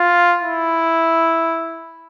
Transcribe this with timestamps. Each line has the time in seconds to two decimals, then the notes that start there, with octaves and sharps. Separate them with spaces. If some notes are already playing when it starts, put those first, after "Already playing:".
Already playing: F4
0.42 E4